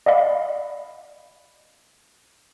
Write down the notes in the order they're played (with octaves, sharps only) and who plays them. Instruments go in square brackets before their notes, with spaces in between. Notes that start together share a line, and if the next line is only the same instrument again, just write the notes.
[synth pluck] D5 D#5 F5 B5